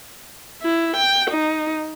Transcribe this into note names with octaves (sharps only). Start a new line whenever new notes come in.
E4
G5
D#4